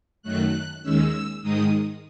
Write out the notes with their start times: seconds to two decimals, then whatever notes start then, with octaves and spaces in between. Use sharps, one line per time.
0.22 F#2 D#3 F#3 A3 F#6
0.83 D#2 D#3 G#3 C#4 E6
1.42 G#2 D#3 G#3 D#4 D#6